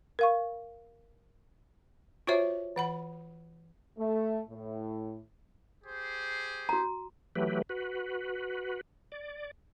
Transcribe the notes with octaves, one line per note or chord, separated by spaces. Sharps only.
A#4 F5 C#6
F4 F#4 C5 C#5 E5
E3 F#5 B5
A3
A2
G4 G#4 C5
F#4 A#5
E3 F#3 A3 G4 B4
F#4 B4
D5